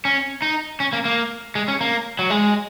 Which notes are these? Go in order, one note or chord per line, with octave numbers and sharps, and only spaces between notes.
C#4
D#4
C#4
A#3
A#3
G#3
C#4
A#3
F#3
G#3